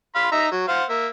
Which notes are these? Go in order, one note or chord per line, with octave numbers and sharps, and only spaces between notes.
F5 B5 C6
D#4 E5 A#5
F#3
C5 F5 F#5
A#3 E5